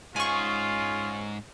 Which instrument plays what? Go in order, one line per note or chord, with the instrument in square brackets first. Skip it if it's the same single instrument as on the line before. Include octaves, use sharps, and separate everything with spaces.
[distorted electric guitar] G#2 G#4 [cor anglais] C#4 [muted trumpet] F4 [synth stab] G#5 C#6